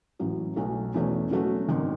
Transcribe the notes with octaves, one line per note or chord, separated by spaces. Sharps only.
A1 A2 F#3 C#4
B1 B2 F#3 A3
E2 B2 A3 C#4
B2 F#3 A3 C#4 F#4
G#1 F#2 D#3